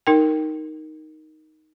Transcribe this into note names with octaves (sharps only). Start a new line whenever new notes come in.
D#4 A#4 G5